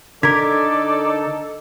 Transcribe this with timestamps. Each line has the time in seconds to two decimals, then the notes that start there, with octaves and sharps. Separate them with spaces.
0.23 D3 D#4 A4 A#4 D5 G#6 B6